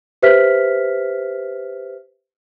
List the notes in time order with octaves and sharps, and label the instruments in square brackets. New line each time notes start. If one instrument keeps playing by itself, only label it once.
[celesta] G4 B4 C5 E5 F6 B6